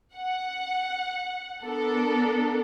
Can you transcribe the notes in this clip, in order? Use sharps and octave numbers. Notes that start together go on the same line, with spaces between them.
F#5
B3 D4 A4 A#4